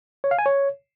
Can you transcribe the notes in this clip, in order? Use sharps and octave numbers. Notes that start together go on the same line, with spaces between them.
C#5
F5
G#5
C#5